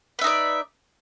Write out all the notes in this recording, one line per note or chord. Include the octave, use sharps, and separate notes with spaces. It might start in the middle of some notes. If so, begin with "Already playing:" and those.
D#4 B4 D5 E5